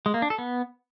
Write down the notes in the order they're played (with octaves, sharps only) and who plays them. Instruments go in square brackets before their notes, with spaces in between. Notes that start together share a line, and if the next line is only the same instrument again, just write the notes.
[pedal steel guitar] G#3
A#3
D4
A4
B3